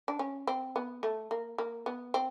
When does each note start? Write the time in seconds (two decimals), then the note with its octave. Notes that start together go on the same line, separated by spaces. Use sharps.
0.08 D4
0.19 C#4
0.47 C4
0.76 B3
1.03 A3
1.31 A#3
1.58 A#3
1.86 B3
2.14 C4